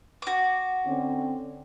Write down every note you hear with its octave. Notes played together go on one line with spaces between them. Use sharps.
F#4 D6
D3 C4 C#4